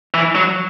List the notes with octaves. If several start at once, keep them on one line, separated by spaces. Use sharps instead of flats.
E3
F#3